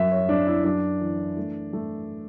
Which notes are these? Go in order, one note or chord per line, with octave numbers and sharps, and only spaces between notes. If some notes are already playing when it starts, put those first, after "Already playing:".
Already playing: F#2 E5
C#5
F#2 D4
E4
F#2 D4
E3
A3
A3